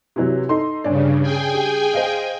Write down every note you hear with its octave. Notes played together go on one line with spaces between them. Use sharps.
C3 E3 F#3
D#4 A4 C6
G2 C#3 C#4 D4 D5
G#4 G5 G#5
G4
C5 D#5 F5